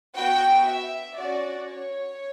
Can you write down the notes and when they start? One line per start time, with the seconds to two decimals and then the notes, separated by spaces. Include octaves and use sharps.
0.15 B3 F#4 G5
0.66 E5
1.17 C#4 F#4 D5
1.68 C#5